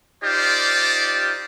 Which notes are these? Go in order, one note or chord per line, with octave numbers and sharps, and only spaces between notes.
D#4 F4 G4 C5 D5